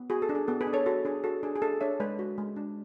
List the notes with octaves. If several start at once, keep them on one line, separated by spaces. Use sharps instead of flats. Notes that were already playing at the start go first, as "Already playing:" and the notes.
Already playing: B3
F#4 G#4
A4
D4
G#4
B3 A4
G#4 B4
D4
A4 C#5
F#4 A4
D4 G#4
F#4 A4
D4 G#4
G#4
D4 A4
D4 C#5 E5
G#3 B4 D5
F#4
G#3
D4